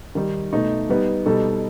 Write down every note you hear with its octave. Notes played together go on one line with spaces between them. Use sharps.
D#3 G3 D#4
B2 A3 D#4
G3 B3 D#4
B2 G3 D#4 A4